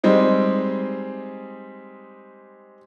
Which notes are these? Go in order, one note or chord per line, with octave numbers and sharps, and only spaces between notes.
G3 G#3 C4 D#4